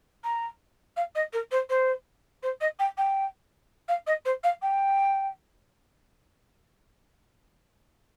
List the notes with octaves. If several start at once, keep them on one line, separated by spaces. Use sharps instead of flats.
A#5
F5
D#5
A#4
C5
C5
C5
D#5
G5
G5
F5
D#5
C5
F5
G5